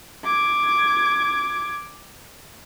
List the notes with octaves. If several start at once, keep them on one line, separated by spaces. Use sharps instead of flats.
D6 G#6